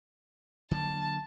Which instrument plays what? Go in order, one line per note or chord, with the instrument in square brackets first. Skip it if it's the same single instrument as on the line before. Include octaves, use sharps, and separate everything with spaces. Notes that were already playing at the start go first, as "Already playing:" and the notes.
[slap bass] D3 F#3 A#3 [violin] A5